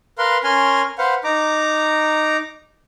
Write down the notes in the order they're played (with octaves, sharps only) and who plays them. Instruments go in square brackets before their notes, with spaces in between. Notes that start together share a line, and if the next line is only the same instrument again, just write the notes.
[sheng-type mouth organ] A#4 B4 F5 C6
C#4 A#4 G#5 C6 F6
B4 C5 F5 F#5
D#4 A#5 D6